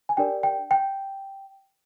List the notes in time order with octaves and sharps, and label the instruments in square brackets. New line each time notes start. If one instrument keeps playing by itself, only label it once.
[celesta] G#5
D4 G4 A#4 D5 G5
G5
G5